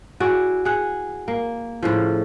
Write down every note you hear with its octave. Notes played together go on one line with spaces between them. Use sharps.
E4 F#4 G#4 D5
G#4 F#5
A#3
A2 C#3 F3